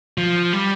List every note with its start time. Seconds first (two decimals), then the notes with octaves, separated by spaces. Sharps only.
0.18 F3
0.53 G3